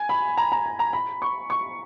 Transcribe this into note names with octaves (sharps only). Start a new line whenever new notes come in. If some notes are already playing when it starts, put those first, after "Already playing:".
Already playing: G#5
B5
A#5
A#5
G#5
A#5
B5
C#6
C#6